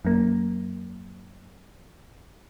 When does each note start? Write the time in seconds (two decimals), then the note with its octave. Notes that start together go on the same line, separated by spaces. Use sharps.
0.05 F#2 A#3